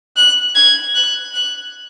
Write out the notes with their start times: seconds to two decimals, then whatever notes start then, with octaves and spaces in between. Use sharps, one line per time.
0.17 F#6
0.56 G#6
0.95 F#6
1.34 F#6